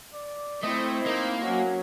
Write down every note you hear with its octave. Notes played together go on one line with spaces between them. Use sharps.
D5
A3 C4 E4 C5 D#5
A#3 D#4
F#3 C#4 F#5